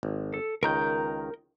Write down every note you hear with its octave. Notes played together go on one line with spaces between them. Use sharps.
G#1
A4
C#2 D#3 A#4 A#5 G6